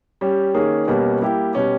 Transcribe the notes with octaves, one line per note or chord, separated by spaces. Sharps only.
G3 C#4 G4
D#3 A#3 C#4 G#4
B2 G3 A#3 C#4
G3 A#3 E4 G4
B2 G3 C#4 G4